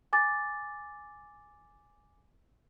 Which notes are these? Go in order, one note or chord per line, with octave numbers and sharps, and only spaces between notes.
G#5 D6 A6